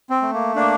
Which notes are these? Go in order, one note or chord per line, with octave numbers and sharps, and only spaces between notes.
C4
A3
A#3
A#3 D4